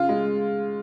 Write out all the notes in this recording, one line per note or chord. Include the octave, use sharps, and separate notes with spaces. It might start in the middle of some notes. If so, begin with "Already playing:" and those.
Already playing: C#3 F4
G#3